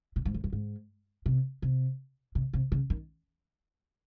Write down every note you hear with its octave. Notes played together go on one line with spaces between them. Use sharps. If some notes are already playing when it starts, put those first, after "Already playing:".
A#2
G#2
F2
F#2
G#2
C3
C3
C3
C3
C#3
D#3